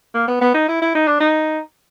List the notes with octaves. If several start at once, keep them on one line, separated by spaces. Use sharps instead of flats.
A#3
B3
B3
D#4
E4
E4
D#4
D4
D#4